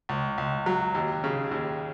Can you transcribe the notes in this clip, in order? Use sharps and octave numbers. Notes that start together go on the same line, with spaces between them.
C#2
C#2
F#3
D#2
C#3
D#2